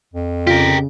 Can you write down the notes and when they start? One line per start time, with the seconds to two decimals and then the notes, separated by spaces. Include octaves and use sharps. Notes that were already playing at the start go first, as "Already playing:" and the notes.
0.13 F2
0.47 C#3 F4 G4 A#4